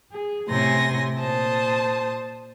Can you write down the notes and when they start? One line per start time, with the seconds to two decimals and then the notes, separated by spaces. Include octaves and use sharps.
0.12 G#4
0.50 A2 C3 C#4 G#5 C6 A#6
1.20 A#2 C5 A5 D#6